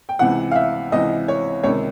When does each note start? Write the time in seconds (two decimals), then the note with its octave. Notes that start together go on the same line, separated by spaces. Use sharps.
0.09 G5
0.19 C#2 C3 E3 F#5
0.51 F5
0.55 E5
0.92 C#2 C3 E3 D#5
1.28 C#5
1.63 C#2 C3 D#3 C#5